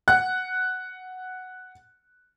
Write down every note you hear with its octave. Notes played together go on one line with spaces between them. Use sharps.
F#5 F#6